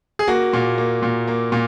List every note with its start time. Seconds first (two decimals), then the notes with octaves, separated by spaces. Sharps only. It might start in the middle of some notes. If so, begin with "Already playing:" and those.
0.19 G#4
0.28 A#3 F#4
0.53 A#2
0.78 A#3
1.02 A#2
1.27 A#3
1.52 A#2